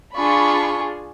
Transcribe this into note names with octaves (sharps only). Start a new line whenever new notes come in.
D4 F4 G#4 B5 C#6